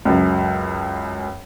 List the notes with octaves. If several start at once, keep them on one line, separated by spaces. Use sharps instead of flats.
C#2 F#2